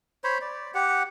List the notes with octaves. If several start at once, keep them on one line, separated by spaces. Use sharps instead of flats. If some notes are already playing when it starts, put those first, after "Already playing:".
C5 C#5 B5
D5
G4 F#5